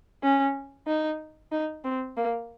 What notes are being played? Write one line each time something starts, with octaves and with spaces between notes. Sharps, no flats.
C#4
D#4
D#4
C4
A#3